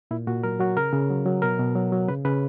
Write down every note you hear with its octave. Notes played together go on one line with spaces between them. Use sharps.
A#2 E4
A#2 F#4
F#3 A#4
F#3 F#4
C#3 A#4
C#3
F#3
F#3
B2 A#4
B2
F#3
F#3
C#3 B4
C#3 B4